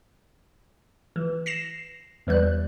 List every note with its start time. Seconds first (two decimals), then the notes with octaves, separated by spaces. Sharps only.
1.16 E3
1.46 A#6 C7 E7
2.27 E2 E3 G3 F#6